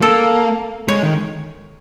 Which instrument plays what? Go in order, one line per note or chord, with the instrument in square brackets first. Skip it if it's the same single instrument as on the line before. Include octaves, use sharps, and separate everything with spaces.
[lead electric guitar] A#3 [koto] A4
[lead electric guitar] G#3 [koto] C#5
[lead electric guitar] D#3